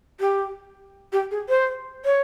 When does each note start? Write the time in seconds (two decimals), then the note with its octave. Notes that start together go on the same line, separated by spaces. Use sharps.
0.20 G4
1.12 G4
1.31 G#4
1.49 C5
2.05 C#5